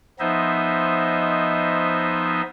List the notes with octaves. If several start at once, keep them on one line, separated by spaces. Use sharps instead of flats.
F3 B3 D#4 C5 D#5 E5